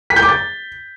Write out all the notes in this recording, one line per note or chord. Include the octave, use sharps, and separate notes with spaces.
B6
G6
D6
A6